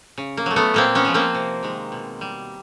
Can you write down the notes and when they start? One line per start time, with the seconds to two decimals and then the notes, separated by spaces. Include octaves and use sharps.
0.18 C#3
0.37 A#3
0.46 F#3 A3
0.56 A3 B3
0.74 A#2 A#3 C4
0.95 B3 C#4
1.05 F3 G#3
1.14 A#3 C4
1.35 C3
1.63 D#3 G#3
1.92 B2
2.21 G3